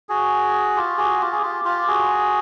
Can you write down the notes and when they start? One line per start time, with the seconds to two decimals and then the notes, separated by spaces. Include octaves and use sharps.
0.09 F#4 G#4
0.77 F4 G4
0.98 F#4 G#4
1.20 F4 G4
1.32 G#4
1.42 F4 G4
1.64 F4 G4
1.88 F#4 G#4